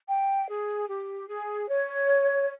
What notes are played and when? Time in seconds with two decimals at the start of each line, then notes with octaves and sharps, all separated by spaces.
0.09 G5
0.48 G#4
0.88 G4
1.28 G#4
1.67 C#5